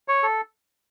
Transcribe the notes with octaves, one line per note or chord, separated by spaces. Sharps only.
C#5
A4